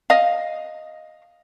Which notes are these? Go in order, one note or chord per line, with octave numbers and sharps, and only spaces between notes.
D#5 F5